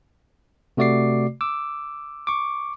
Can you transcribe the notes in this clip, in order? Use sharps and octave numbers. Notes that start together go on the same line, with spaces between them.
C3 A3 F#4 D5 D6 C7
D6 E6
C#6 D6